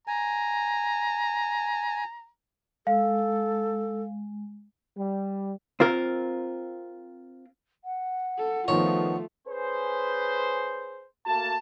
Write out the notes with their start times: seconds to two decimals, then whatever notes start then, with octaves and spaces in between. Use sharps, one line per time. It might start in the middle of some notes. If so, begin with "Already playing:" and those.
0.07 G#5 A#5
2.87 G#3 A4 F5
4.97 G3
5.80 C4 F4 A#4
7.84 F#5
8.38 A4
8.68 D#3 F3 A3 B3 F4 C#5
9.48 C#4 G#4 B4 C5
11.26 A3 A#3 F#4 A5